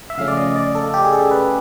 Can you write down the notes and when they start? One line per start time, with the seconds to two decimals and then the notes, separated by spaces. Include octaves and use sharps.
0.10 E5
0.18 C#3 F3 A3 C#4 F5
0.28 D5
0.37 D#5
0.56 D5
0.75 A4
0.94 G4
1.05 G#4
1.13 A4
1.31 B4